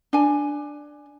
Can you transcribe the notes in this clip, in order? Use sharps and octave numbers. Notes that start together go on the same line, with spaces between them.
D4 G#5